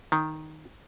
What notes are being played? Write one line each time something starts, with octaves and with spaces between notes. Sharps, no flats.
D#3